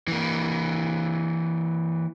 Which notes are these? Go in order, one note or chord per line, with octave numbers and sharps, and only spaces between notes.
E3 A#3